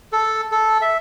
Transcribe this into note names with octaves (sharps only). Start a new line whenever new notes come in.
A4
A4
E5